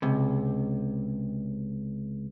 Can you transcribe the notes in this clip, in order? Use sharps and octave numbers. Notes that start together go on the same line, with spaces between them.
C#2 C3